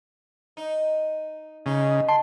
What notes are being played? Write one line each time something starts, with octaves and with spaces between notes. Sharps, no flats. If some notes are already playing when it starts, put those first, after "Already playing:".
D#4
C#3 D#4
A5 C6